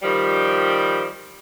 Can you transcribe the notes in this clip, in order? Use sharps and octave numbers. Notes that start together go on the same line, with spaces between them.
D#3 F3 G3